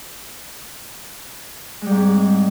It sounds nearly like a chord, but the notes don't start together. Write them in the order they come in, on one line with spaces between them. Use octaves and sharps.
G#3 G3 G#2 C4